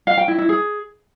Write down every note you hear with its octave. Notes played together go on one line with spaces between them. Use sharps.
F5
G5
E4
E4
G#4